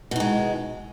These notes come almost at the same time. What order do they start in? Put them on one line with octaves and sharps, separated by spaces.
B2 D#3 G#3